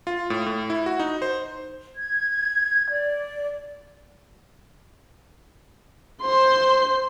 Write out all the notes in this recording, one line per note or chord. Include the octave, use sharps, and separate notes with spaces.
F4
A2
A2
E4
F#4
D#4
C5
G#6
D5
C5 C6